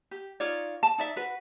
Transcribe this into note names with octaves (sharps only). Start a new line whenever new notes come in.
G4
D#4 F4 C#5 D5
A5
D#4 D5 E5
F#4 B4